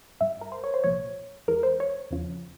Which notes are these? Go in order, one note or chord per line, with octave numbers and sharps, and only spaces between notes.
G2 G3 E5
A#4
C5
C#5
C5
C2 A#2 F3 C#5
E2 E3 G#3 A#4
C5
C#5
E2 C#3 F3